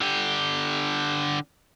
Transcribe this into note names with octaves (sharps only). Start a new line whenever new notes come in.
D3 G4